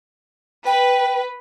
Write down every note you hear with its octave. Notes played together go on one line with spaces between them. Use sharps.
B4 G5